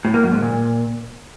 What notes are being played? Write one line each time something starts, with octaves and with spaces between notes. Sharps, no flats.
A2
A#3
F#2
G#2
A#2